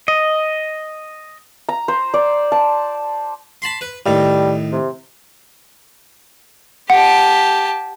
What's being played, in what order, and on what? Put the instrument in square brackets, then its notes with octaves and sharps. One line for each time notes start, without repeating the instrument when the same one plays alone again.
[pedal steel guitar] D#5
[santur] A#5
C5
D5
A5
[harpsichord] A5 B5 C6
B4
[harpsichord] A2 D#3 [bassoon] G3
[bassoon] C3
[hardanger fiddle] G4 A5 [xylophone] F#5